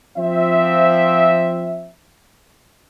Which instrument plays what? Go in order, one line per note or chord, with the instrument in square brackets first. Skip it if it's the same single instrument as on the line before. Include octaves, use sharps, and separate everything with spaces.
[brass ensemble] F3 C4 E5